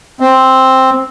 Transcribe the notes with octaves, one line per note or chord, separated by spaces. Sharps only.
C4